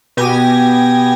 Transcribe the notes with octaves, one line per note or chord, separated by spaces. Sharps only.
B2 G4 G#5 G#6 A#6